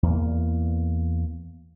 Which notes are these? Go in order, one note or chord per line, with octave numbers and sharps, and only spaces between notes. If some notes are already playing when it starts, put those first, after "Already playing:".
E2 A#3